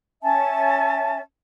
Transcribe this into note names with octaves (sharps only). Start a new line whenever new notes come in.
C#4 E5 G#5 A5